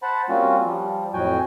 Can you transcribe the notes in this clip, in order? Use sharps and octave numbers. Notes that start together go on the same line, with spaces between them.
C5 F#5 A5 B5
G3 A#3 C4 C#4 F4 F#4
F3 G3
F2 A2 F#3 F#4 G5 G#5